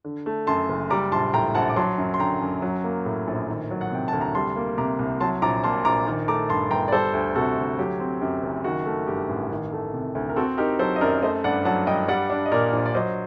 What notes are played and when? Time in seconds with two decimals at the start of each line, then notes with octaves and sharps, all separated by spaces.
0.04 D3
0.26 A3
0.47 F#2 A5 C6
0.69 F#1
0.90 G3 A#5 D6
1.12 A#1 A5 C6
1.33 A2 G5 A#5
1.55 A#1 F#5 A5
1.69 D6
1.76 F#3 A5 C6
1.98 F#2
2.14 C6
2.19 D3 G5 A#5
2.41 F#2
2.62 F#3
2.84 A#3
3.05 A2
3.27 A#1
3.49 D#3
3.71 F#3
3.81 F#5
3.91 C3 G5
4.08 D2 A5
4.21 A#5
4.34 G3 A5 C6
4.56 A#3
4.78 C3 A#5 D6
4.99 C2
5.20 F#3 A5 C6
5.42 A#1 A#5 D6
5.64 A#2 A5 C6
5.85 A#1 A#5 D6
6.07 D#3
6.28 A3 A#5 D6
6.49 G2 A5 C6
6.71 G1 G5 A#5
6.88 D5
6.92 G3 A4 C5
7.14 D2
7.35 C3 F#4 A4
7.57 D2
7.78 F#3 G4
8.00 C4
8.21 F#2 G4
8.43 F#1
8.64 D#3 F#4
8.86 A3
9.07 G2 G4
9.29 A1
9.51 D#3
9.72 A3
9.93 C3
10.15 D2
10.29 A#4
10.36 C4 F#4 A4
10.58 D#4 G4 A#4
10.79 F#3 A4 C5
10.96 D#5
11.01 F#2 A#4 D5
11.22 A3 C5 D#5
11.44 G2 D5 F#5
11.65 F#3 F#5 A5
11.87 G2 D#5 G5
12.08 G3 D5 F#5
12.30 D4
12.46 D#5
12.52 A#2 A#4 D5
12.73 A#1
12.86 D5
12.94 F#3 C5 D#5